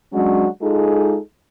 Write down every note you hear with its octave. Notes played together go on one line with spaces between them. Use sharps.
F#3 G#3 C#4 D4 F#4
G#3 D#4 F4 G#4 A4